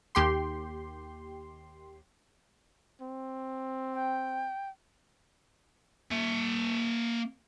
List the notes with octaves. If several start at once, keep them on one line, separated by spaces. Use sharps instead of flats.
D#2 G4 C6
C4
G5
A#3 E5